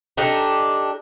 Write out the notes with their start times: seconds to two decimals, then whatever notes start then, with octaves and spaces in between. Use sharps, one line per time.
0.17 D4 D#4 G4 A4